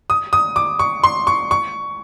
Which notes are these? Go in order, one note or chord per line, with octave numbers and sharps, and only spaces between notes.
D#6
D#6
D6
C#6
C6
C#6
C#6